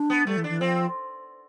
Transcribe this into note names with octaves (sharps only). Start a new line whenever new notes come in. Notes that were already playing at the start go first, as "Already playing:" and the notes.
Already playing: D4
B3
G3 A3
E3
D4
E3
F3 C4